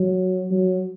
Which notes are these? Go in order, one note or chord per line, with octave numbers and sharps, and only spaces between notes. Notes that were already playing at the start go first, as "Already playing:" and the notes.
Already playing: F#3
F#3